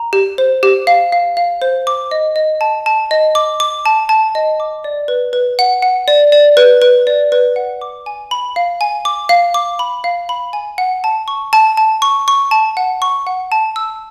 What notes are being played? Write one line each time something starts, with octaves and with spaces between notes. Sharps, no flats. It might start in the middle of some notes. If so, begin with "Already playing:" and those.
Already playing: A#5
G4
C5
G4
F5
F5
F5
C5
D6
D#5
D#5
A5
A5
D#5
D6
D6
A5
A5
D#5
D6
D5
B4
B4
F#5
F#5
D5
D5
B4
B4
D5
B4
F#5
D6
G#5
B5
F5
G#5
D6
F5
D6
B5
F5
B5
G#5
F#5
A5
C#6
A5
A5
C#6
C#6
A5
F#5
C#6
F#5
A5
E6